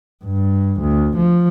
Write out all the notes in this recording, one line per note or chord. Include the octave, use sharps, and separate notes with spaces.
G2
D2
F3